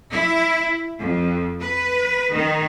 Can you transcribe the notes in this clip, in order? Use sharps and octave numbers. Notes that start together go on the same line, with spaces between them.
E4
F2
B4
D#3